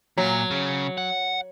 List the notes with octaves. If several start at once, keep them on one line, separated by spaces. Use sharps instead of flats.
A#2 F#3
C#3
F#5